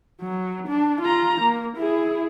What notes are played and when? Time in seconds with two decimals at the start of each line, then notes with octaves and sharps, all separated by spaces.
0.22 F#3
0.68 D4
1.02 F4 A#5
1.41 A#3
1.77 E4 G#4